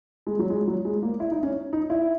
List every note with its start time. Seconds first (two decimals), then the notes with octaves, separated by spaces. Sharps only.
0.27 G#3
0.39 F#3
0.50 G#3
0.67 F#3
0.85 G#3
1.03 A#3
1.20 E4
1.31 D#4
1.43 C#4
1.73 D#4
1.90 E4